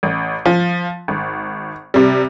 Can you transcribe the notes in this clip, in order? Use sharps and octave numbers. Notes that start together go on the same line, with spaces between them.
A1
F3
G#1
C3 G3